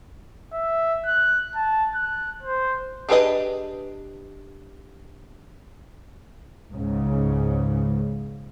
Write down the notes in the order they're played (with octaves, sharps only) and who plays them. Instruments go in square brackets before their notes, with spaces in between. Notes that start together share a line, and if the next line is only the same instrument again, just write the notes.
[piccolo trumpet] E5
F#6
A5
F#6
C5
[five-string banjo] D4 G4 G#4 B4 D#5
[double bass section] C#2 G#2 C#3